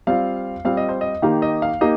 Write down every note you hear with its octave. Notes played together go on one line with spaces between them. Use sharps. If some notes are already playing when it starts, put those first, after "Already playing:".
G3 C4 F4 F5
G3 C4 F4 F5
D#5
C5
D#5
D#3 A#3 D#4 G4 F5
D#5
F5
A#3 D#4 G4 D#5